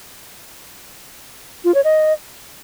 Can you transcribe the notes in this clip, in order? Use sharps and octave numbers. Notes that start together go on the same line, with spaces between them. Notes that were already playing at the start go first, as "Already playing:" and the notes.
F4
C#5
D#5